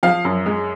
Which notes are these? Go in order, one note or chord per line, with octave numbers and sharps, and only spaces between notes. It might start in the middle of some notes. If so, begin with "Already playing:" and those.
F3 F5
F#2
G#3